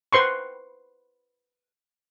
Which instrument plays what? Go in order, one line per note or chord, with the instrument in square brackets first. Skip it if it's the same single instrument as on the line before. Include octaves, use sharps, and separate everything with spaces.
[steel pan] B4 C5 C6 C#6